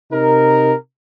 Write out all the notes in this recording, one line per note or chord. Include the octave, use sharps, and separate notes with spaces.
C3 D#4 A#4